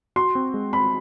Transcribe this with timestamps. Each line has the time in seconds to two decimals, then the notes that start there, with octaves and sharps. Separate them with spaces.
0.16 F#4 C6
0.35 C4
0.54 G#3
0.72 C4 B5